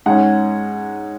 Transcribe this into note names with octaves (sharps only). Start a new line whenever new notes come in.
G#2 G#3 C#4 F#5